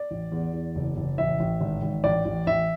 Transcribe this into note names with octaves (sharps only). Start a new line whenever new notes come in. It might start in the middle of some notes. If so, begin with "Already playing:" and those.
Already playing: D5
A1
E2
E2
F#1
F#1
A1 E5
A1
G#1
G#1
A1 D5
A1
A1 E5